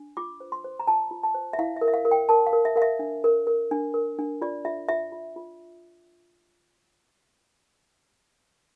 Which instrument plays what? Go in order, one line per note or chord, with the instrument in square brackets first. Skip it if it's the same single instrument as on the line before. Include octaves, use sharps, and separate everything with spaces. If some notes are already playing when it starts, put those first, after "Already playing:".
Already playing: [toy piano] D4
F4 D6
C5
C6
C5
A#5
F4 A5
F4
A5
C5
E5
E4 F5
E5
A#4
E5
F5
A#4
G5
A#4 A5
F5
A#4
E5
A#4 F5
E5
D4
A#4
A#4
D4
A#4
D4
F4 D5
F4 E5
F4 E5
F4
F4